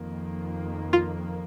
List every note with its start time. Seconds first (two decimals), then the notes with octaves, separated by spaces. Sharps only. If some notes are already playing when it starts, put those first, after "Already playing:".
Already playing: F2 D#3 A#3
0.93 F4